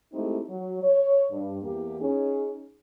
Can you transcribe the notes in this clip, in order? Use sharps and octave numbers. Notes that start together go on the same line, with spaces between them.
G#3 A3 C4 D#4 E4 G4
F#3
C#5
G2
E2 A#3 G4
C#4 D#4 G#4